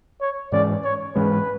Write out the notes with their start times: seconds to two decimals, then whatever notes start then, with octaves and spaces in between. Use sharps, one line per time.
0.21 C#5
0.52 G#2 E3 G#3 C#4 D5
0.84 C#5
1.16 G#2 E3 G#3 C#4 B4